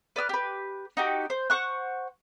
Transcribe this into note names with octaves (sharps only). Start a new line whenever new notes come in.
B4 D5 E6 F6
G4 B4
D#4 F#4 G4
C5
C5 F#5 C#6 F#6